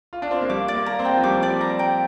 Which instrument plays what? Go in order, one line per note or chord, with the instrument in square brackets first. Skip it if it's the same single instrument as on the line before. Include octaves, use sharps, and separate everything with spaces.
[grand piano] F4
D4
C4
A#3
[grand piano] G3 [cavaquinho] D6
[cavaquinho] D5
[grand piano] A#3
[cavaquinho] A#5
[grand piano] C4
[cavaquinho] G5
[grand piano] F3
[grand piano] G3 [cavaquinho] D6
[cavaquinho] D5
A#5
G5